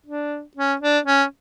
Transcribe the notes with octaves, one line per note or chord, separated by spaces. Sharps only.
D4
C#4
D4
C#4